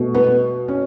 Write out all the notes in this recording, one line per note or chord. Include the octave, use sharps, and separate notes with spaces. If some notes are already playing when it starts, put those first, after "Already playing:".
Already playing: B2 A3
B3
C#4